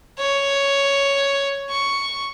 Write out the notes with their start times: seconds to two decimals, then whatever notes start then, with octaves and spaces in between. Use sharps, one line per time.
0.19 C#5
1.70 C#6